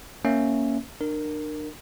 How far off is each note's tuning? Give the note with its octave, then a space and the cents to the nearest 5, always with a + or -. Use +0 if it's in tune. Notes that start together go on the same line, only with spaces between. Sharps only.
A#3 +0 C#4 +0 E5 +0
D4 +40 A#4 -5